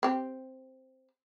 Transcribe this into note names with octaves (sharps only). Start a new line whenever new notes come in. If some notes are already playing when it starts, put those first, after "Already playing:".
C4 G4